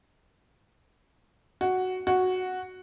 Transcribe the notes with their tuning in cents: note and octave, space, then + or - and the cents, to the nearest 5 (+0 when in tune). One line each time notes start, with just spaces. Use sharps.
F#4 +0
F#4 -5